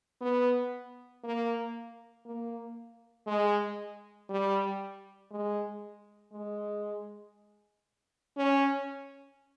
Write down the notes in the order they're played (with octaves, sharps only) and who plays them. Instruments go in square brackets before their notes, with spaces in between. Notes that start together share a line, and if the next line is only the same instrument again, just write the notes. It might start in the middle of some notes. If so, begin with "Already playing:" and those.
[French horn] B3
A#3
A#3
G#3
G3
G#3
G#3
C#4